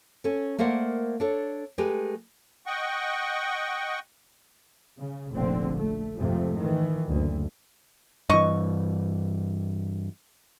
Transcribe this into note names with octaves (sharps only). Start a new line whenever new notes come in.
C#4 A4
A3 A#3 A#4 C5 D5 F#5
D4 A4 C#5
G#3 A3 G4 B4
D#5 F#5 G5 C#6
C#3
F1 A#1 D3 C4
A3
F2 G#2 C3 F3 A3
D#3 E3
F#1 D2
G2 E3 D#5 C#6